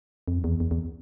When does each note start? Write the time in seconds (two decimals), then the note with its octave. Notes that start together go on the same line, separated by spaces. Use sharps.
0.28 F2
0.44 E2
0.60 E2
0.71 E2